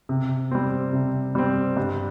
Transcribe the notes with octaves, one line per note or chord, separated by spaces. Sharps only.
C3
G3 C4
C3
G3 C4
G2